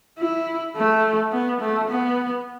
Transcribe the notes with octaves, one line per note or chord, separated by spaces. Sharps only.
E4
A3
B3
A3
B3